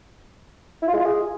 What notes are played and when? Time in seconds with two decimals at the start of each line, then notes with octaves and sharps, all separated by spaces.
0.82 E4
0.88 F4
0.93 G#3
0.99 F4
1.05 G#4